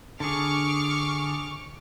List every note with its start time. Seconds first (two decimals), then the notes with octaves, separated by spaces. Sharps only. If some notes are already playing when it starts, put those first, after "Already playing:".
0.20 D3 G#4 C#6 D6 F6